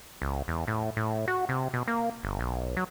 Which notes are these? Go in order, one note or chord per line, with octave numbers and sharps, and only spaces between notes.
C#2
E2
A2
A2
F#4
C3
B2
A#3
G1
B1
F#3